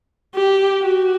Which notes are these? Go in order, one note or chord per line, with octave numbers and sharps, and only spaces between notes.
G4
F#4